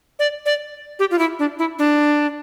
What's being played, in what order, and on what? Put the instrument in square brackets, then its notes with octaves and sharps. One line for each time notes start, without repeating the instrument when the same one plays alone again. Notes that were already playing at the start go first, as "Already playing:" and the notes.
[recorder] D5
D5
G4
F4
E4
D4
E4
D4